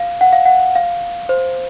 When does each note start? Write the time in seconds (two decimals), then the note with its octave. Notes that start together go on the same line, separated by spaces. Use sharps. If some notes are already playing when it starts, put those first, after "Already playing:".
Already playing: F5
0.21 F#5
0.33 F5
0.46 F#5
0.75 F5
1.29 C5